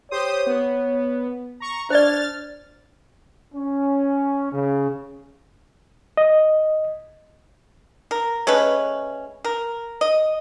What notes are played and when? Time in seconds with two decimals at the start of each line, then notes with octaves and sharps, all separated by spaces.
0.11 G4 C5 C#5 D#6
0.46 B3
1.60 A#5 C#6
1.90 D4 C5 D5 F6 A6
3.54 C#4
4.53 C#3
6.17 D#5
8.11 A#4
8.47 G#3 A3 C#4 B4
9.45 A#4
10.01 D#5